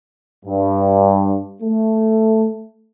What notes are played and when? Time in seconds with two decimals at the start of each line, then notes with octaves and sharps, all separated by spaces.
0.45 G2
1.63 A3